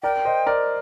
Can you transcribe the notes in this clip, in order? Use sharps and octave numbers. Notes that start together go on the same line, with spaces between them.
A#4 D5 G5
C5 D#5
A#4 D5